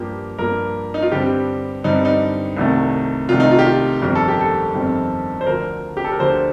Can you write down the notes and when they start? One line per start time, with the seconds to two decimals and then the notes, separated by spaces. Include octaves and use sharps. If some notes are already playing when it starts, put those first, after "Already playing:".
Already playing: G2 F3 A#3 G4
0.39 G2 F3 A#3 A#4
0.94 D#4
1.02 F4
1.12 G2 D3 G3 C4 G4
1.84 G2 D3 G3 C4 D#4
2.05 D#4
2.57 C2 C3 D#3 A3
3.29 C2 C3 D#3 A3 F4
3.40 D#4
3.51 F4
3.59 G4
3.65 F4
4.01 G1 F2 D#3 G3 C4 A#4
4.15 A4
4.28 G4
4.41 A4
4.74 G1 F2 D#3 G3 C4
5.41 C5
5.47 D2 D3 F3 A#4
5.97 G4
6.04 A4
6.12 A#4
6.19 D2 D3 F3 C5